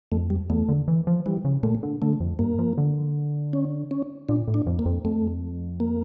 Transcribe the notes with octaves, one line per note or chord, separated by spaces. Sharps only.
F2 A3
G3
E2 A3
D3
E3
F3
E3 G3
C#3
A#2 A3
D3
D3 A3
F2
G2 A#3
F3
D3
C#4
C#4
A#2 D4
A2
D4
F2
A#3
F2
F2 A3
A#3